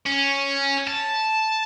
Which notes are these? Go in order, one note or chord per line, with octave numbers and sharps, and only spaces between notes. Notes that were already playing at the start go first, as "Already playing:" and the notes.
C#4
A5